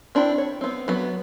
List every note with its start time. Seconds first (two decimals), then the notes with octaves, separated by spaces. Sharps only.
0.15 C4 D4 E4 G5
0.38 C#5
0.61 B3 C4
0.88 F#3 B3